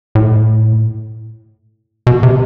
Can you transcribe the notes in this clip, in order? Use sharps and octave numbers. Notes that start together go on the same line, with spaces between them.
A2
B2
C3